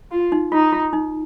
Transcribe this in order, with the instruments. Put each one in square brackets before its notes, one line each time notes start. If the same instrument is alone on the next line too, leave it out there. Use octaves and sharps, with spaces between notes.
[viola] F4
[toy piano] D#4
[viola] D#4 [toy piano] F4
[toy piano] F4
D#4